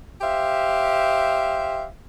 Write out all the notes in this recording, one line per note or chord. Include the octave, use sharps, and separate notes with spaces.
G4 C5 E5 F5